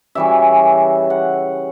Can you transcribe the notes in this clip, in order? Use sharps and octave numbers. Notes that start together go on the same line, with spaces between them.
C#3 E3 G3 C#4 E5
F#5